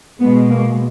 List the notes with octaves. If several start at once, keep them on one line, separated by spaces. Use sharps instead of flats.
B2 G#3 B3
A#3